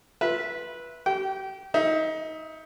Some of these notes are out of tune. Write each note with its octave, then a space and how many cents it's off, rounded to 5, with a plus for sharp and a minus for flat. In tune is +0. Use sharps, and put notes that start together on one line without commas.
F4 +0 B4 -15 E5 +0
G4 -35 G5 -25
D#4 +25 E5 +0